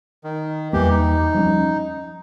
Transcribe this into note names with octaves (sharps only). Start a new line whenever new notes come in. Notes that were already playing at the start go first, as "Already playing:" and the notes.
D#3
E2 E3 G3 A#3 G4
D#4
F3 G3 C#4